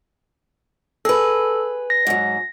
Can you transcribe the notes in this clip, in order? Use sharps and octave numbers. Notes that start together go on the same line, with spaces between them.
G#4 A4 B4
A#6
G#2 F#3